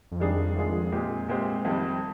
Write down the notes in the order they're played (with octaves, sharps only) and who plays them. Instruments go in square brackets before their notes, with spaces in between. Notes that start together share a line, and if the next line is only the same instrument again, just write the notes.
[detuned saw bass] F2
[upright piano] D#3 G3 D4 G#4
D#3 G#3 D4 F4 G#4
A#2 G#3 C4 G4
A#2 G#3 C4 G4 C5
F2 D#3 G3 C4